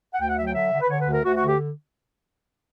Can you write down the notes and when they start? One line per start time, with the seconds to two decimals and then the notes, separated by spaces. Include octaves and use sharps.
0.14 F#5
0.21 D2 G5
0.29 F#5
0.38 F#3 E5
0.47 G5
0.55 D3 E5
0.73 D3
0.81 B4
0.90 D3 C#5
1.01 B4
1.07 D2
1.13 A#4
1.24 D2 F#4
1.37 F#4
1.42 D3
1.48 G4